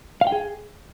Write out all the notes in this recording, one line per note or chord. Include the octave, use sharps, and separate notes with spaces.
F5
G5
G#4